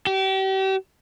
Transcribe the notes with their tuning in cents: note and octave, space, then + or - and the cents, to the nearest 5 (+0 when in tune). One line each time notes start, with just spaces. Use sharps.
G4 -35